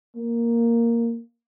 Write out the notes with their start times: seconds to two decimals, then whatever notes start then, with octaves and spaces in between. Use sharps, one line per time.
0.16 A#3